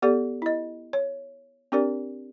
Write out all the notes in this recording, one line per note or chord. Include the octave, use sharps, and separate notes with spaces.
B3 G4 A4 D5
E4 D#5
C#5
C4 D4 G4 A#4 D5